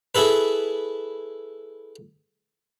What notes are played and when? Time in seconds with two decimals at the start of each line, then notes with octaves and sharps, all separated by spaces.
0.15 E4 G#4 A4 B4